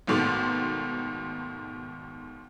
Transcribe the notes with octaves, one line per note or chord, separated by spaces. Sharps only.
G#1 G#2 B2 D#3 A3 D6